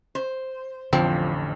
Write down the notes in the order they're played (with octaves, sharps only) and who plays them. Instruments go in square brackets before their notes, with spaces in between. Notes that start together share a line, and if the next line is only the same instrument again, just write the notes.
[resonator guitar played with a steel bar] C5
[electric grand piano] A1 F2 [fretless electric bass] D3 [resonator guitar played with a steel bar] F3 [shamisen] C4